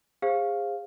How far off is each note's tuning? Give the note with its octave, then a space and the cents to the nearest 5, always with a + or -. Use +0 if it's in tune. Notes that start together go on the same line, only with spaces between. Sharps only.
G#4 -30 C5 +20 F5 +0